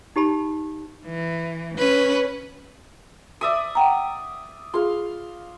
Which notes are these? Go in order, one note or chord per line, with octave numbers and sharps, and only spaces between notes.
D#4 G4 A5 B5
E3
C#4 B4
D5 E5 D#6
F#5 G5 A#5
F4 G#4 F5 C6